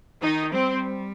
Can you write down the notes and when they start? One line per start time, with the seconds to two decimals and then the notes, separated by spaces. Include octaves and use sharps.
0.22 D#3 D#4
0.52 G3 C4